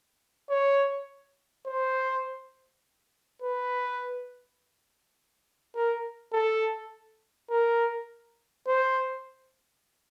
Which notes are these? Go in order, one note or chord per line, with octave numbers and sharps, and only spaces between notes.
C#5
C5
B4
A#4
A4
A#4
C5